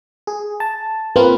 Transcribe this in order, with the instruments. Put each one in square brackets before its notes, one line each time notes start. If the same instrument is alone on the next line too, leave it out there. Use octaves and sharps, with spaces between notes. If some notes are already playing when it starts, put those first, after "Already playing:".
[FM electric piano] G#4
A5
[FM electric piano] A#3 C4 F4 [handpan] B4